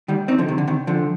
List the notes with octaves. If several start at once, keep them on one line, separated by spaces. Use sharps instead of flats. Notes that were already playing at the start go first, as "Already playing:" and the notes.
D#3 G3
C4 D#4
D3 F3
C3 D#3
D3
C3 D#3
D3 F3